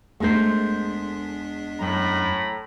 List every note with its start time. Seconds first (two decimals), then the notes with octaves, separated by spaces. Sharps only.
0.20 E2 G#3 A3 D4 A4 A#4 C5 B6
1.80 F#2 A2 A#5 B5